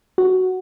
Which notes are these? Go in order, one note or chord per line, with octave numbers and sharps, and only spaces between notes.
F#4